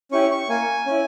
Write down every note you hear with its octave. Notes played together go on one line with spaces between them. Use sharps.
C#4 E4 G4 C#6
C#6
A#3 G#5
C#4 E4